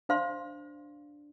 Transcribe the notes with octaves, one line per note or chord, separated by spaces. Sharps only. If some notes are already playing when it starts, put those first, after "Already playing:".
D4 C5 F5 C6